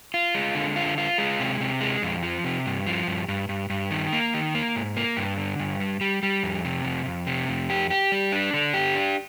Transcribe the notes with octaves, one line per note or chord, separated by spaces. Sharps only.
F4
G#3
D3
F4
F4
G#3
C3
C3
G#3
F2
F3
C3
G2
F3
G2
G2
G2
G2
D#3
A#3
D#3
A#3
G#2
A#3
G2
D3
G2
G3
G3
G3
F2
C3
F2
F2
C3
F2
G4
G4
G3
D4
D3
G4
D4